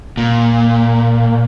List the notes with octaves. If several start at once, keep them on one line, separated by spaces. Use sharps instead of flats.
A#2